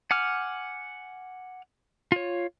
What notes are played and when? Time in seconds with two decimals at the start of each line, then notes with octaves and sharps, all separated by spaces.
0.11 F#5 G#5 D6 F6
2.12 F4 C#5